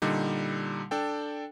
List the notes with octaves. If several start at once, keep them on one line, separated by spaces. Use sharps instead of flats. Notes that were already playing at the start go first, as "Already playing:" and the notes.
A#2 D3 G3 D#4
D4 A4 G5